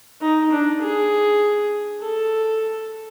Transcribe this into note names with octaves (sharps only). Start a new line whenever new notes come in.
D#4
D4
G#4
A4